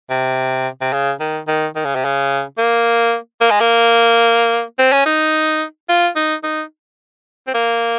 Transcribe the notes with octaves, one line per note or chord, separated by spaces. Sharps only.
C3
C3
C#3
D#3
D#3
D#3
C#3
C3
C#3
A#3
A#3
G#3
A#3
C4
C#4
D#4
F4
D#4
D#4
C4
A#3